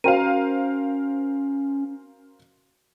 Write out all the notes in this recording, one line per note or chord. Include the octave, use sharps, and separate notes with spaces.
C#4 F#4 A#4 C5 F5 G5 D#7